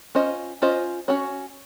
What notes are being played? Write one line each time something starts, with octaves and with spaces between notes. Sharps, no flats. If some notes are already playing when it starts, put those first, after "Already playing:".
C#4 F4 C5 D#5
C#4 F4 C5 D#5
C#4 F#4 C#5